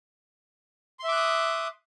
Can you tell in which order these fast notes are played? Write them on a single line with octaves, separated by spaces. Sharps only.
C6 E5 D6 F#6 D#6